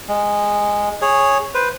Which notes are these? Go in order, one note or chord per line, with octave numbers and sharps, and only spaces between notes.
G#3
G#4 C#5
B4 C5